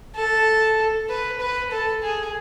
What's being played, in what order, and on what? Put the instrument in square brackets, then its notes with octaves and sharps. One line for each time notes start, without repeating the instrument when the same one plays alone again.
[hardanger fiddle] A4
B4
B4
A4
G#4